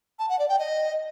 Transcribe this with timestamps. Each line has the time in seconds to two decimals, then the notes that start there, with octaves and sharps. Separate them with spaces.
0.19 A5
0.29 F#5
0.39 D5
0.49 G5
0.59 D#5